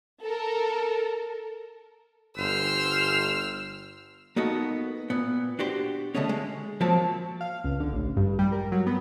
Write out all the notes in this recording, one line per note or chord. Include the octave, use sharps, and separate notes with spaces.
A4 A#4
G1 C5 E6 F6
A#3 B3 D#4 F#4 A4
A#2 B3
D4 F#4 G4 C5
D3 G#3 A3 B3 C#4
G#3
F3 F#3 A#3 C4 A5
F5
C#2
D3
A1
G2
G3
A#4
F#3
B3